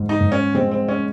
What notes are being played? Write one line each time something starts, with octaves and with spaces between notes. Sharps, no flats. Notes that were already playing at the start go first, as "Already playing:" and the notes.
Already playing: G#2 G#3
D#4
G#2
C#4
G#3 C4
C4
C#4